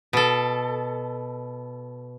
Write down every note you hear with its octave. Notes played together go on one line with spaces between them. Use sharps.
B2 A4